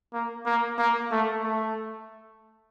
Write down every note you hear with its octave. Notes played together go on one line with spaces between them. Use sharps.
A#3
A#3
A#3
A3
A3